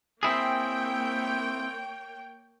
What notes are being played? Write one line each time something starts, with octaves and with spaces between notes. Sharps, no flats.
A#3 C4 E4 G#4 C#5 G5